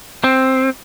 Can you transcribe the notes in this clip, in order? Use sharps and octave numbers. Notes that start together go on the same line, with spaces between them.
C4